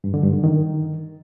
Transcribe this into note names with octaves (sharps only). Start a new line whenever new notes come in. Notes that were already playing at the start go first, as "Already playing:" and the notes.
G2
D3
G2
D3
D#3